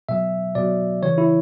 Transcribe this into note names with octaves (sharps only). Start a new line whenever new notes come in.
B2 F#3 E5
B2 F#3 D5
C#3 E3 C#5
E4